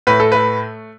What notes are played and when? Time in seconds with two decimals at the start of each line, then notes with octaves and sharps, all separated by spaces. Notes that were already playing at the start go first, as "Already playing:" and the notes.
0.07 A2 B4
0.20 A4
0.32 A3 B4